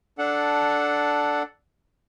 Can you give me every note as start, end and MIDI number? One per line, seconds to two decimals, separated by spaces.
0.18 1.43 62
0.18 1.43 69
0.18 1.43 78